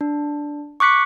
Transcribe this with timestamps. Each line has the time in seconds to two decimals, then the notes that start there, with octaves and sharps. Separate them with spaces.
0.01 D4
0.80 C#6 D6 F#6 B6 C#7